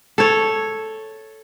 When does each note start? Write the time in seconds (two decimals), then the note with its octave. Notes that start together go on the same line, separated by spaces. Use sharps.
0.18 A4 C#5